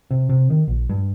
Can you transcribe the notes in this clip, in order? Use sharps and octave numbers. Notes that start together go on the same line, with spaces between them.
C3
C3
D#3
A#1
G2